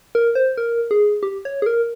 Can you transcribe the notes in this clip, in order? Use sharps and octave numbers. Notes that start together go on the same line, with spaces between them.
A#4
C5
A#4
G#4
G4
C#5
G#4
A#4